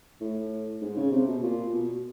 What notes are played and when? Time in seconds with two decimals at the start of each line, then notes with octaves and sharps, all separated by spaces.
0.21 A2
0.82 G#2
0.97 C#3
1.12 C3
1.28 B2
1.43 A#2
1.73 B2